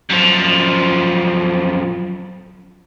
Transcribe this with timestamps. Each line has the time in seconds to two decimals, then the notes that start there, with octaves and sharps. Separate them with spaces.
0.10 F#2 F3